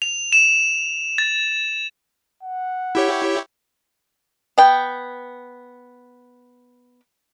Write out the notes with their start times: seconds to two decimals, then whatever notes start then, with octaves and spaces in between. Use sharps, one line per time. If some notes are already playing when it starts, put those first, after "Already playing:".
0.02 F7
0.32 E7
1.18 A6
2.43 F#5
2.95 E4 G4 C#5
4.58 B3 G5